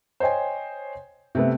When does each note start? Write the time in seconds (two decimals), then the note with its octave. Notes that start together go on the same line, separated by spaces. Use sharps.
0.20 C5 C#5 D#5 G5 G#5
1.35 C3 A3 B3